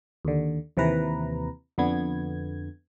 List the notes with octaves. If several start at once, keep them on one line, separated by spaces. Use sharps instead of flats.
D#2 D3
D#2 C3 E3 B4 A#5
F2 D3 B3 G#6